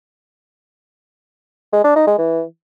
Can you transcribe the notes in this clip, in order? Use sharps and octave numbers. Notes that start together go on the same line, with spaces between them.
G#3
D4
D#4
G#3
E3